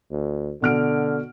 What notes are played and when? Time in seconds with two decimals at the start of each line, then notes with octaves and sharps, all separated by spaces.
0.10 D2
0.62 B2 D3 F6 D7